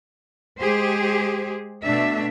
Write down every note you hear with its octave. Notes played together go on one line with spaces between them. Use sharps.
G#3 G4 G#4 C5
B2 A3 D4 E5